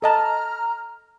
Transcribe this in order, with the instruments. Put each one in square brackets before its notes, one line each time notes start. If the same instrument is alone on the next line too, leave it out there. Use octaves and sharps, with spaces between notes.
[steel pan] A4 D#5 A5 [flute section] A#5 F6